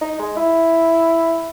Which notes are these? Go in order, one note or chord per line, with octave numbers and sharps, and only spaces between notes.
D#4
G#3
E4